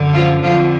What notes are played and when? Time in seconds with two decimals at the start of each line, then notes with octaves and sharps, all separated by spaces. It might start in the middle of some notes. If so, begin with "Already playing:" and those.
Already playing: F#2 D3
0.13 F3 F4
0.42 F2 D3 F3 F4